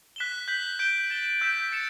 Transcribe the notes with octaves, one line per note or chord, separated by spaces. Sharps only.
F#6 B6 E7 G7
G6 B6 F#7
G6 D7 G7
A6 E7 G7
E6 G6 B6 E7
A6 C#7 E7